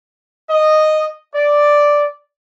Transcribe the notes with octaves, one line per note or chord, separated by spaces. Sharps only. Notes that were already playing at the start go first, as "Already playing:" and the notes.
D#5
D5